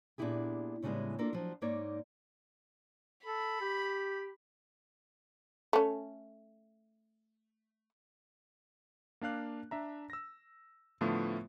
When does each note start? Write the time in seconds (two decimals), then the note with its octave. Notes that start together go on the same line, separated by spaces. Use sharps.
0.18 A#2 B3 D4 E4 G4 G#4
0.83 A2 C#3 G3 G#3 B3 E4
1.19 A#3 D4 F4 A4 A#4
1.33 F3 F#3
1.62 G#2 A#3 D#4 C#5 D5
3.25 A4 B5
3.61 G4
5.73 A3 C#4
9.21 A#3 D4 F5 F#6
9.71 D4 E5 A#5
10.10 E6 A#6
11.01 A2 D3 F3 A3 B3 F4